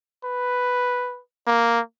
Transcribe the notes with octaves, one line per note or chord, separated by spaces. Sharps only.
B4
A#3